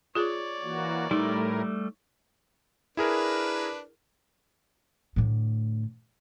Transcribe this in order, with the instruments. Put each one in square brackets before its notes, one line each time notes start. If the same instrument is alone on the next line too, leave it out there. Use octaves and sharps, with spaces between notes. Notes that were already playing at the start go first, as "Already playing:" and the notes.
[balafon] F4 G#4 [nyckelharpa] C#5 D5
[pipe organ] E3 A#3 F#4
[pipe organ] A2 E4 A#4 [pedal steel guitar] G3 A3 [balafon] D#4
[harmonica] D4 B4 [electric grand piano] E4 G#4 A#4
[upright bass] A2 D3